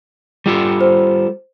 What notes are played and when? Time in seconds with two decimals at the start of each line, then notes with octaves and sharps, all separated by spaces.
0.46 G3 F4 A4
0.81 C5